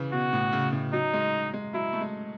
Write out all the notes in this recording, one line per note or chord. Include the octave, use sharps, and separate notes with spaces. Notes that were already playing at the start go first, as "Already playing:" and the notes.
Already playing: C#3 E3
B2 F#4
A2
C#3
A2
F#3 D#4
G#3
G#3
F#3 E4
A3
G#3